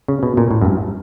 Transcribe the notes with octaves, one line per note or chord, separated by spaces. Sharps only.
C#3
B2
A#2
A2
F#2
G2